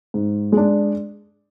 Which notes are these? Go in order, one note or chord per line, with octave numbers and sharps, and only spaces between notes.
G#2
G#3 D4